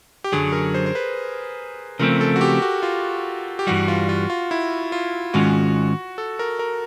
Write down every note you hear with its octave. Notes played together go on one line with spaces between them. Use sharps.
G4
F#2 D3 F#3 G#4
A#4
C5
C5
B4
C#3 F3 A3 C4 A#4
A4
F#4
G4
F#4
F4
G4
G2 E3 G3 F#4
F4
F4
F4
E4
F4
G#2 D#3 G#3 C#4 F4 F#4
A4
A#4
A#4